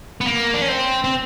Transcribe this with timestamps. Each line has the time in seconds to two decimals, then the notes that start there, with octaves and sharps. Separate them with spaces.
0.21 B3
0.26 A#3
0.54 D4
0.62 C#4
0.69 C4
1.04 C4